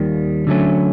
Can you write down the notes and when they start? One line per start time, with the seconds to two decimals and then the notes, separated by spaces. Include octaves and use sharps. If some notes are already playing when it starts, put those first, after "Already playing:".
Already playing: D#2 D#3 G3
0.47 D3 F#3 A3 C#4